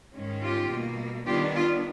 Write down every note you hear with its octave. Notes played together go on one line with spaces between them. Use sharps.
G#2 D#3 G#3 C#4
F4 G4
B2 G3 A#3
D#3 G3 B3 D4 F4 G4
F4